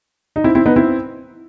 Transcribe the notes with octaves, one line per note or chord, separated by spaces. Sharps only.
D#4
C4 E4
C4 E4
B3 D#4
C4 E4